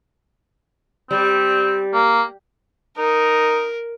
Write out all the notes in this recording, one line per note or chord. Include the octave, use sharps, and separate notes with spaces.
G3 C4
A#3
D#4 A#4